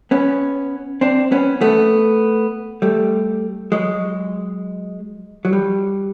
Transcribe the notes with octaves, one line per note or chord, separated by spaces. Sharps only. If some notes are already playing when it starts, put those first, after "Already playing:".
B3 C#4
C4 D4
B3 C#4
A3 B3
G3 A3
F#3 G#3
F#3
G3